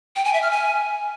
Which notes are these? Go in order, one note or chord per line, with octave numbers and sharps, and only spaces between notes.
G5
G#5
E5
F6
G#5